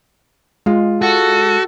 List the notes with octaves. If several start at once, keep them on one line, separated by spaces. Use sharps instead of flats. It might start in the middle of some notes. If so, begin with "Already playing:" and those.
G#3 F4
F#4 A4